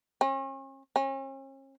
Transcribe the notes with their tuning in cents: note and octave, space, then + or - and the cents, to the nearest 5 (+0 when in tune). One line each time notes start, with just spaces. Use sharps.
C#4 -40
C#4 -40